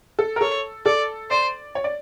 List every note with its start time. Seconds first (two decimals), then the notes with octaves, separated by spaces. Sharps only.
0.19 A4
0.36 A#4
0.41 A4 C#5
0.86 A4 D5
1.30 C5 D5
1.75 C#5
1.84 D5